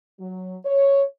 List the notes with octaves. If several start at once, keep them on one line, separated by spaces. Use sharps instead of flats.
F#3
C#5